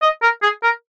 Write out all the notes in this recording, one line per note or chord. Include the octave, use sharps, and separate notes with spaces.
D#5
A#4
G#4
A#4